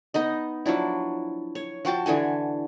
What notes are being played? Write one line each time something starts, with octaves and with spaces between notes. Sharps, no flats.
B3 D#4 D#5
F3 F#3 D4 E4
C#5
F3 F#4 G5 A5
D3 E3 A4 G#5